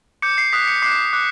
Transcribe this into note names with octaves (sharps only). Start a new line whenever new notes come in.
D6 G6 C#7
C7
D#6 F#6 B6
C#7
D6 F#6 C7
D6 F#6